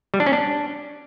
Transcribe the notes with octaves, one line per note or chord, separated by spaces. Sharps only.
G3
D4
C#4
D4